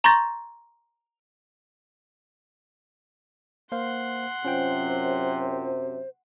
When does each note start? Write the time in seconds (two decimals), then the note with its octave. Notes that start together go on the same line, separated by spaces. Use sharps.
0.04 A#5 C6 C#6 G6 A6 A#6
3.72 A#3 C5 F5 F#5 C6
4.45 F#2 C3 C#4 F4 C5 G5